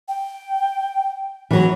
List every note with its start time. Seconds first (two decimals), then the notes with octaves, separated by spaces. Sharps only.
0.08 G5
1.51 E3 F#3